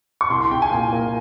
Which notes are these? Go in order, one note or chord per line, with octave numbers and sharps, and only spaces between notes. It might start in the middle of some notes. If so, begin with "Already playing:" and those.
C#6
C2 C6
C6
C2 G5
G#5
A#2
A#3